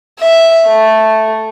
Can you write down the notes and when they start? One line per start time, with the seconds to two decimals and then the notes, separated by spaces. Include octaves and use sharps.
0.20 E5
0.67 A3